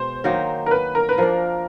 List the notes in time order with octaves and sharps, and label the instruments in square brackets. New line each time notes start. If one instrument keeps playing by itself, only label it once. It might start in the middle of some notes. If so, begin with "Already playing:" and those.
Already playing: [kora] B2 G#3 [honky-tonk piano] C5
[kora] D#3 F#3 A#3 D#4
[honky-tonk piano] A#4
B4
A#4
B4
[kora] F3 A#3 D4 [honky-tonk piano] A#4